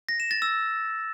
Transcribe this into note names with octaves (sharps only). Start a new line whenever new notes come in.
A#6
E7
A6
E6